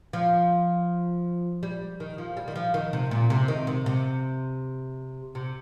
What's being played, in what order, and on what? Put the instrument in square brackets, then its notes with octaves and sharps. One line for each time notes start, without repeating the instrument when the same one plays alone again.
[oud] F3
G3
D#3
F3
G3
D#3
F3
D#3
C3
A#2
C3
D#3
C3
C3
C3